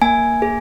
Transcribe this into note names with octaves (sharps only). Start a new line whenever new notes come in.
A#3 G#5
G#4